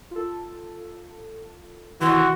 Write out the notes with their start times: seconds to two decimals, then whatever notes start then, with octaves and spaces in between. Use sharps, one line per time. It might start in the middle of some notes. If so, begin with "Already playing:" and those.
0.11 F4 A4
2.01 C3 D#3 E3 F#4 C6